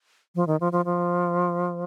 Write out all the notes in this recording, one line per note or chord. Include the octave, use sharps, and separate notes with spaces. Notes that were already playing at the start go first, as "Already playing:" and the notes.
F3
D#3
F3
F3
F3